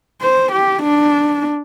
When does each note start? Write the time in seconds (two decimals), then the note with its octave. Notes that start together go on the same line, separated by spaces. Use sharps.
0.21 C5
0.52 G4
0.82 D4